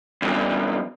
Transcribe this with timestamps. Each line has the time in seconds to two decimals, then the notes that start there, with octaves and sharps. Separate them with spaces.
0.22 E2 G2